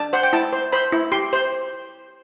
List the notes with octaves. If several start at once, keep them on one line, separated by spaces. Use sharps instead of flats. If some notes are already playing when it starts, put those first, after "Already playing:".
Already playing: D4 A5
C5 F#5
G5
E4 A5
C5
C5 B5
E4
G4 C6
C5